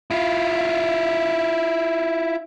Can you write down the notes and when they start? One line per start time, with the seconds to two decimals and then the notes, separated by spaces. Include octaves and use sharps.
0.11 E4 F4